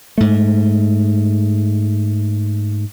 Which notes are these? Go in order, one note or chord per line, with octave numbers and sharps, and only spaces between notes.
G#2 A3